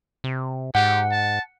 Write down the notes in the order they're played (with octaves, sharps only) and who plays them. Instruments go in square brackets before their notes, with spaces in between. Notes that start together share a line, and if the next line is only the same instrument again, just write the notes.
[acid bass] C3
[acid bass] G#2 [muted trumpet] G4 [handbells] F#5
[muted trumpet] A5